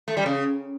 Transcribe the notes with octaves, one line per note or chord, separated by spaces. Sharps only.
A3
G3
C#3